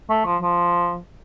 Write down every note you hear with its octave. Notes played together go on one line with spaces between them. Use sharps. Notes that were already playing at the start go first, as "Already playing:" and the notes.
A3
F3
F3